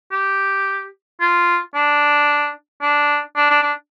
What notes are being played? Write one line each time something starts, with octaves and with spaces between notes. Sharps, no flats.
G4
F4
D4
D4
D4
D4
D4